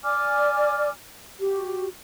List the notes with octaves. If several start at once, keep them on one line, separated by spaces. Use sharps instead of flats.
D5 G#5 D6 F6
F#4 G4